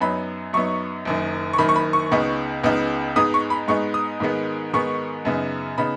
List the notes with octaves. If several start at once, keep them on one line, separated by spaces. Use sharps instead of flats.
F#2 F#3 B3 D#4 B5
F#2 F#3 B3 D#4 C#6
F#1 F#2 D#3
C#6
F#1 F#2 D#3 B5
C#6
B5
C#6
C#2 C#3 B3 D#4
C#2 C#3 B3 D#4
G#2 G#3 B3 D#4 D#6
C#6
B5
G#2 G#3 B3 D#4 C#6
D#6
G#2 D#3 G#3 B3
G#2 D#3 G#3 B3 C#6
F#2 C#3 B3 D#4
C#3 B3 D#4 B5